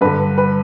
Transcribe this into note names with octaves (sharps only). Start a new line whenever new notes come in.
G2 D3 B4
B4